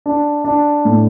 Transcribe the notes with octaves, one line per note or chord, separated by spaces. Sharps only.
D4
D4
A2